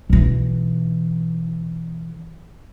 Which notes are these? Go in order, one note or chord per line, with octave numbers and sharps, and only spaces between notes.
B1 E3